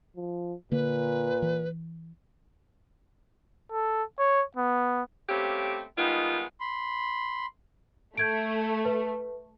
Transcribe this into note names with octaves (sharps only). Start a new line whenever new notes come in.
F3
A#2 D3 A#3 B4
E3
A4
C#5
B3
G3 A3 A#3 C4 C#4 G4
D#3 G3 G#3 B3 D#4 F4
B5 C6
A3 G6 G#6 D7
B4